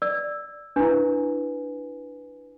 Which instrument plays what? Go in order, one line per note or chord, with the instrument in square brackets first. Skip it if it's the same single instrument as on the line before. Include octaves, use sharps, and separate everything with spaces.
[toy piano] D5 [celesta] E6
[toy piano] D4 E4 [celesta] B4 G#5